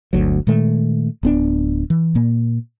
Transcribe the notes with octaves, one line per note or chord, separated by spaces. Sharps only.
G1 D2 F#3
A#2 D#3 G#3 A3
D1 B3 D4
E3
A#2 A#3